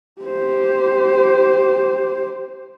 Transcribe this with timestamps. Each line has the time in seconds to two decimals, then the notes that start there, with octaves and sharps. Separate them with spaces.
0.21 G4 C5